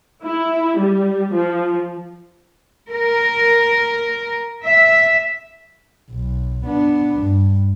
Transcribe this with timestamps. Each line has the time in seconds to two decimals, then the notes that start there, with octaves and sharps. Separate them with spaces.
0.24 E4
0.79 G3
1.33 F3
2.90 A#4
4.63 E5
6.10 B1
6.66 B3 D4
7.21 G2